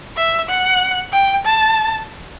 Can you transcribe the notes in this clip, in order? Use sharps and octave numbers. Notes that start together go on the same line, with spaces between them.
E5
F#5
G5
A5